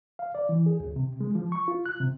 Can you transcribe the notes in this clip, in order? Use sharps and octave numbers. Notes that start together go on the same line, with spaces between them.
F5
D5
E3
G#4
D2
C3
G#3
F3
C#6
F4
F#6
C3